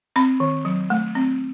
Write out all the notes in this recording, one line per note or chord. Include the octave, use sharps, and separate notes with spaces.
C4 B5
D#3
F#3
A3
C4